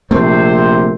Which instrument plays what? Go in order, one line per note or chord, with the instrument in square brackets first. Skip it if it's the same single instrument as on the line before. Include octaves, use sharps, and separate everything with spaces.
[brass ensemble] A#1 C3 C5 [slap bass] A3 C4